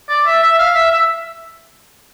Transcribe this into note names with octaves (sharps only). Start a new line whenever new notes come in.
D5
E5
E5
F5
E5
E5